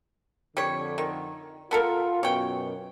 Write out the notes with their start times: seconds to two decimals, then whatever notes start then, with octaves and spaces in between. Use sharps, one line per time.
0.57 F2 D3 G3 C#5
0.98 D#3
1.71 B3 F4 A4 A#4
2.23 F#2 B2 C#5 G5